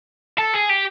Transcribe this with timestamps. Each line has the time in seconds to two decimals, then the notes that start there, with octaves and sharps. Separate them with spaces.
0.38 A4
0.54 G#4
0.69 G4